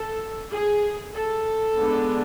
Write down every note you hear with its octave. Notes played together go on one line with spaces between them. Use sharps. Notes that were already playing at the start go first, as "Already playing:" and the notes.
Already playing: A4
G#4
A4
D3 G#3 B3 D4